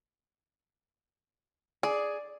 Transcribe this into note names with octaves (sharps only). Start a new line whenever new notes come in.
G#4 D5